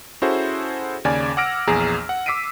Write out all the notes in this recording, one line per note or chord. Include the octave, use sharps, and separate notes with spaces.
C#4 E4 F#4 G#4 A4 C5
D#2 C#3 D5 G#5 D6 G#6
F#5 D6 E6 F6 A#6 D7
A#1 E2 G#4 A#5
F#5
D6 E6 B6 C7 D7 D#7